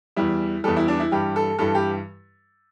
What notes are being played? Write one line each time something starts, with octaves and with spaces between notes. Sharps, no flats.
E2 E3 G3 E4
E2 E3 G3 A4
E4
D4
E4
G2 E3 G3 G4
A4
G2 E3 G3 A4
G4